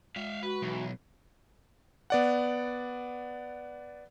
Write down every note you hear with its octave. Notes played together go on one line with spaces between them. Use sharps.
G#3 E5 F5
F#4 B4
B1 E3
B3 D5 F#5